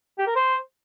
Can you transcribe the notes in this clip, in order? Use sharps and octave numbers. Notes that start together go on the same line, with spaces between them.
G4
A#4
C5